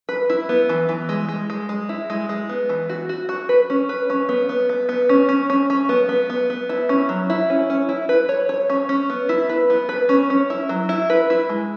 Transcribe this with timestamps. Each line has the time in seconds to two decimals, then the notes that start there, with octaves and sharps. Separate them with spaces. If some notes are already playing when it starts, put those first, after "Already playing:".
0.09 B4
0.30 E4
0.49 B3
0.69 E3
0.89 E3
1.09 G#3
1.29 G#3
1.50 G#3
1.69 G#3
1.89 E4
2.10 G#3
2.29 G#3
2.49 B3
2.69 E3
2.89 F#4
3.09 F#4
3.29 F#4
3.49 B4
3.70 C#4
3.89 B4
4.10 C#4
4.29 B3
4.49 B3
4.69 B3
4.89 B3
5.09 C#4
5.29 C#4
5.50 C#4
5.70 C#4
5.89 B3
6.09 B3
6.30 B3
6.50 B3
6.69 E4
6.89 C#4
7.09 F#3
7.30 E4
7.50 C#4
7.70 C#4
7.89 E4
8.09 B4
8.29 C#5
8.49 C#5
8.70 C#4
8.89 C#4
9.10 B3
9.29 E4
9.49 B4
9.70 B3
9.89 B4
10.09 C#4
10.30 C#4
10.50 E4
10.69 F#3
10.89 E4
11.10 B4
11.30 E4
11.49 G#3